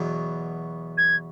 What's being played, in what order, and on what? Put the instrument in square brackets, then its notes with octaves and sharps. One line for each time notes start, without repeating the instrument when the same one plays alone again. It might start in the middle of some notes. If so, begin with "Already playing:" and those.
Already playing: [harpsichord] E2 B2 F#3
[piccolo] G#6